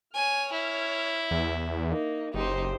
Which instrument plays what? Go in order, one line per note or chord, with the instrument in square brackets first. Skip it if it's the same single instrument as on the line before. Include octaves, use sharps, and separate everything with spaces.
[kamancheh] C#5 F6 [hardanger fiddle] G#5
[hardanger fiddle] E4
[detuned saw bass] E2
[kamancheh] A#3 D#4
[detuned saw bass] F#1 [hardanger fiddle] D#4 [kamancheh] G4 C5